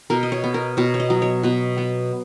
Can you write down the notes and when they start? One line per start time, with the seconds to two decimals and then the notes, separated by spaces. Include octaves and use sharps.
0.10 B2 A#4
0.23 D#5
0.32 C#5
0.44 B3
0.54 A#4
0.77 B2 C#5
0.94 C#5
1.00 D#5
1.10 F#3
1.22 C#5
1.43 B2 B4
1.78 B3